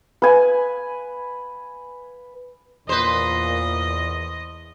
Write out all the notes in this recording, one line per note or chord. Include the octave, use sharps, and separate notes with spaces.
B4 G#5
E2 A#2 B4 C5 D#5